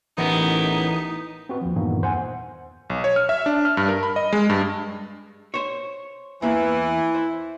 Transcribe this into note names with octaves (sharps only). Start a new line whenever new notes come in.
A1 E3 B3 D#4 E4 A#4
C4 F#4 B4
D#2 F3
G2 A#2 D#3 E3 A#3 B3
E2 C5 F#5 G#5
B1
C#5
F6
E5
D4
F6
G2
A#4
B5
D#5
G#3
G2
C5 C#5
E2 E3 A#3
C5